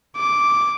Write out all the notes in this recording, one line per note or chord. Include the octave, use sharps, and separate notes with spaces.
D6